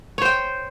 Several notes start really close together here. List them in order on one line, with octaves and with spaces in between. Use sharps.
C#5 C5 G5